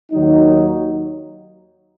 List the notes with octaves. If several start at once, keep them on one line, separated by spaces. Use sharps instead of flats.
D#2 D#3 F#3 D#4